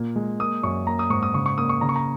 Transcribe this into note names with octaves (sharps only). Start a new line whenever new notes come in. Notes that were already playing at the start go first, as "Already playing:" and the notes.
Already playing: A#2 A#3
G#3
A#3 D#6
F#2 C#6
A#3 A#5
D#6
G#2 C#6
D#6
C#3 C#6
C#6
A#3 D#6
C#6
C#3 A#5
C#6
A#5